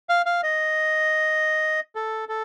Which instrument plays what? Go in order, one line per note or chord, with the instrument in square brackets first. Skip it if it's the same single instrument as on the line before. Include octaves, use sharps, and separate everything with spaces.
[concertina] F5
F5
D#5
A4
A4